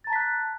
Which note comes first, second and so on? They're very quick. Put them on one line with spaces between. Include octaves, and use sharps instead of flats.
A6 A#5 A5 B6 F#6